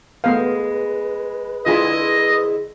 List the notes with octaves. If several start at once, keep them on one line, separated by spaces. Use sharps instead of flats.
G#3 A3 B3 B4 F5
D3 G#3 E4 F4 G#4 D#5 B5